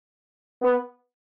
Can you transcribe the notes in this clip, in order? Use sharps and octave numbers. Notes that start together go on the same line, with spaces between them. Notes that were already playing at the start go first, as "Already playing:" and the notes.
B3